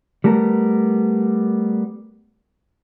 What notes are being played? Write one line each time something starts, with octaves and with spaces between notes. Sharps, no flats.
G3 A3 B3 A#4